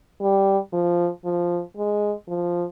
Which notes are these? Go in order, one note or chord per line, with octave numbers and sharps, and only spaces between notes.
G3
F3
F3
G#3
F3